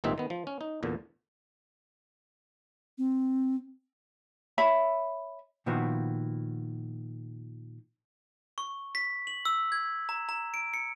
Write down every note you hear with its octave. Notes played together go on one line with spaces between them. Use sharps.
G#1 G2 A#2 C4 D#4 E5
D#3 B3
F3
C#4
D#4
E2 A#2 D3
C4
C#5 E5 B5
A#2 D#3 F3 B3 E4 F#4
C#6
B6
F#7
E6
G#6
A#5
A#5
D7
C#7